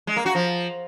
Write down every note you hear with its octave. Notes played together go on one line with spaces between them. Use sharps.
G#3
A#3
F#4
F3